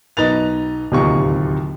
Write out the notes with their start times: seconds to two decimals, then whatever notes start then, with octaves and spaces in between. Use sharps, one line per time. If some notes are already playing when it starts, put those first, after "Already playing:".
0.17 B1 D#4 B4 A6 F7
0.92 D1 D#2 C3 D#4 F4 C#6